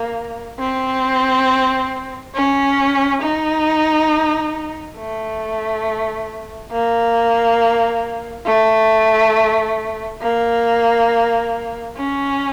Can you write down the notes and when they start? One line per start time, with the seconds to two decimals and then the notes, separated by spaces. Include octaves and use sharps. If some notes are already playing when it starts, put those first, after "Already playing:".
Already playing: A#3
0.59 C4
2.34 C#4
3.21 D#4
4.97 A3
6.71 A#3
8.46 A3
10.22 A#3
11.96 C#4